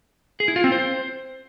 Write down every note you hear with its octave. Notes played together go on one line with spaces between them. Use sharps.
G#4
E4
F4
C4
C5